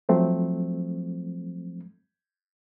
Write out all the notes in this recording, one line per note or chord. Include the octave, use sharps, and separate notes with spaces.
F3 F#3 A3 C4